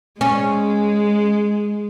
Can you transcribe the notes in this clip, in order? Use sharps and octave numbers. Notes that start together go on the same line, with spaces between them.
G#3 C#4